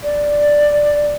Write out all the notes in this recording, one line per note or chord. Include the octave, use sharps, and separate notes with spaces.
D5